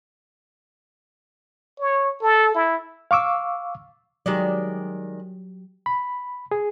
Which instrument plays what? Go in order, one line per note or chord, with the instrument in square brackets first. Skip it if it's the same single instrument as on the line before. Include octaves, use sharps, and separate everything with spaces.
[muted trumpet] C#5
A4
E4
[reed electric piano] F5 C#6 D6 E6
[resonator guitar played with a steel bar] D#3 G#3 D5 [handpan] F#3 G4
[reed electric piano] B5
G#4